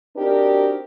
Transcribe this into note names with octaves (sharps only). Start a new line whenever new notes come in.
C4 D4 D#4 F#4 G4 A#4